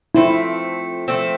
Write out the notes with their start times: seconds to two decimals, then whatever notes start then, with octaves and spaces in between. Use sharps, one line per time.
0.15 F3 A3 C4 E4
1.08 F3 A3 C4